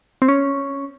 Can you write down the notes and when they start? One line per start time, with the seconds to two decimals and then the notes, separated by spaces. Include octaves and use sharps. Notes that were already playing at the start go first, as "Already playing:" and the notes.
0.22 C4
0.28 C#4